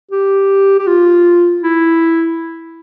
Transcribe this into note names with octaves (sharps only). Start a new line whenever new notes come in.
G4
G4
F4
E4